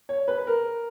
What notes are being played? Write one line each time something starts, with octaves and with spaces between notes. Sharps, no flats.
C#5
B4
B4
A#4